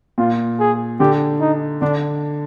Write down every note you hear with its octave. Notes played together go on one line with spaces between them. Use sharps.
A#2 F4
G#4
D3 G4
D#4
D3 D4